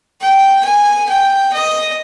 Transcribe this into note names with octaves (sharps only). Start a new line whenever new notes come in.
G5
G#5
G5
D#5